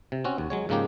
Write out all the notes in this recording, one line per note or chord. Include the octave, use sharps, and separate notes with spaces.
C3
C4 C#4 F#4
D#2
F#3 G#3 C#5
G#2 C#3 F3 A#3 D#4 G4